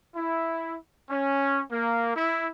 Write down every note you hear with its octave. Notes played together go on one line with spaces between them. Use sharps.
E4
C#4
A#3
E4